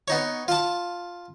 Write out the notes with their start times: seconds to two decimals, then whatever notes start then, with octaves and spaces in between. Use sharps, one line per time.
0.08 B3 D#4 C#5
0.48 F4 A5